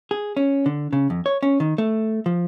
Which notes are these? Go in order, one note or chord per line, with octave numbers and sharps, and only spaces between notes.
G#4
C#4
D3
C#3
F2
C#5
C#4
D#3
A3
F3